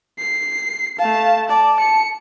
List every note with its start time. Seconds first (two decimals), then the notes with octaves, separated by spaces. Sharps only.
0.19 C7
0.99 A3 F5 A5
1.50 D5 A5
1.80 C#7